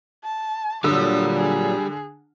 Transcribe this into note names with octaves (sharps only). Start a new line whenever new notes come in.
A5
A#2 D3 F#3 G3 D#6 E6
G#4